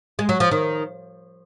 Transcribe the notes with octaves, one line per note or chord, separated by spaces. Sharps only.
G#3
F#3
F3
D#3